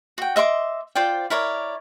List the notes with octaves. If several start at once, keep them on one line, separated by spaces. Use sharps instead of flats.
F#4 G5
D#5 E5 C6 D6
F4 C5 D5 G5
E4 A#4 C#5 D5